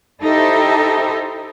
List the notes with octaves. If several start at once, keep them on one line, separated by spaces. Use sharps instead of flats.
D#4 E4 G4 A4 C5 E5